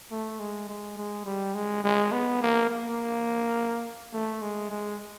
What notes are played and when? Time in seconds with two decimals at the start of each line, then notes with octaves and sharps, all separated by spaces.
0.11 A3
0.39 G#3
0.69 G#3
0.97 G#3
1.25 G3
1.54 G#3
1.84 G#3
2.12 B3
2.41 A#3
2.69 A#3
4.13 A3
4.42 G#3
4.70 G#3